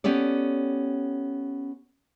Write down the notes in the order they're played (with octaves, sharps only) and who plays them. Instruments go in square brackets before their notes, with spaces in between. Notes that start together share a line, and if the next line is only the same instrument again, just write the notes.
[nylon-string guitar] B3 C#4 G4 A4 D5